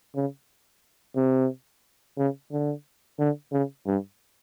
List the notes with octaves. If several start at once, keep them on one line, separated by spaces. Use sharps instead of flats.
C#3
C3
C#3
D3
D3
C#3
G2